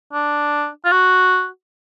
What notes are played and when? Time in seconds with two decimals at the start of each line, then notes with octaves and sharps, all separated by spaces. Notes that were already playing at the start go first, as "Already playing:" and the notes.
0.13 D4
0.85 F4
0.92 F#4